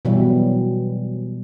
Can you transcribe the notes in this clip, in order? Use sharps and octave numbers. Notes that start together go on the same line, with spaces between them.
B2 E3 F#3 G3